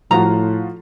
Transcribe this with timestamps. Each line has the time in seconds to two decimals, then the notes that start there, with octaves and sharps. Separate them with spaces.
0.11 A2 F3 F4 F#4 A#5